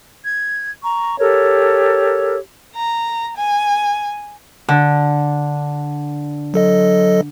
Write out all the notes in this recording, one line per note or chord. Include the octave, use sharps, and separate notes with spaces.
G#6
A#5 C#6
G4 A4 A#4 C#5
A#5
G#5
D3
F#3 A4 D#5